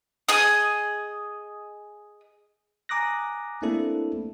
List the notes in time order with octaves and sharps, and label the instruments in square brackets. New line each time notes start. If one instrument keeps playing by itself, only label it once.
[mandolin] G#4 D#5 D#6
[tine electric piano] G#5 A#5 D6 D#6 F#6 A#6
A3 A#3 C4 D4 E4 A4